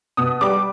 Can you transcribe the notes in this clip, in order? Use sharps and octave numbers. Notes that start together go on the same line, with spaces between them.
B2 D#6
G3 D6